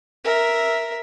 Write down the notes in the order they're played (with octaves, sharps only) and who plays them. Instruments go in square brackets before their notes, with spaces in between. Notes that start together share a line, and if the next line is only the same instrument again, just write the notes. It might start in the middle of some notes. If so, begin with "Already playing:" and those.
[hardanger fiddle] A#4 E5